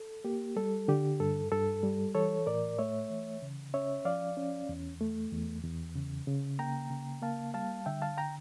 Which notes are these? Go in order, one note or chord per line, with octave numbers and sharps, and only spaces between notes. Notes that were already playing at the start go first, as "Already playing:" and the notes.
Already playing: A4
A#3 G4
G3 A4
D3 G4
G2 A4
G2 A4
G3
E3 A4 C#5
A2 A#4 D5
A3 C#5 E5
E3
C#3
C#4 C#5 E5
F3 D5 F5
C#4
E2
A3
E2
E2
C#3
C#3
A#3 G5 A#5
C#3
A#3 F5 A5
G3 F5 A5
D3 E5 G5
F5 A5
G5 A#5